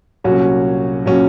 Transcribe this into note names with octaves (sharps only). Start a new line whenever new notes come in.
C2 A#2 F#3 C#4 F#4
A#2 F#3 C#4 F#4